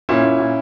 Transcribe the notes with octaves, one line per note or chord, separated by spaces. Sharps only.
A#2 C#4 E4
A#2
A#2